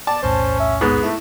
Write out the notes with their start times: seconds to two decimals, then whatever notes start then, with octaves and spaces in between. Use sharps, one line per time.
0.07 D5 A5
0.23 B1 E2 A2 C#4 C5
0.60 E5
0.81 G#2 B3 G#4
1.03 A3 E4